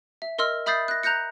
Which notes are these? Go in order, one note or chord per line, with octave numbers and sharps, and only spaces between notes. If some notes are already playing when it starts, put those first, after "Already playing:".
E5
A#4 D#5 C6 E6 F6
E5 B5 D#6 G6 A6 C7
F#6 A#6
A#5 F#6 G6 A#6 C#7